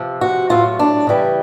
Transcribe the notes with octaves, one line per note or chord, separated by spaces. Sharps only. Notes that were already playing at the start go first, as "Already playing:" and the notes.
Already playing: C3 F3
F#4
A2 F#3 F4
D4
C#3 E3 G3